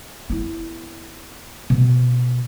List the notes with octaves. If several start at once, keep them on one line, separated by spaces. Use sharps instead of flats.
B3 E4
B2